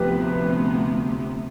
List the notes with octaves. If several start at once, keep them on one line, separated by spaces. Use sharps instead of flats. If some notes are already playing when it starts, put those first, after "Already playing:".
Already playing: D2 C3 F3 B3 G4 B4